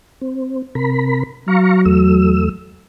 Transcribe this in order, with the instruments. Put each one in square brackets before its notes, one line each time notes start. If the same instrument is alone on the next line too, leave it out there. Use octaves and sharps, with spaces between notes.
[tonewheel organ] C4
C3 A#4 B5
[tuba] F#3 [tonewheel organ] F5 A#5 C#6
[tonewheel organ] E2 A3 E6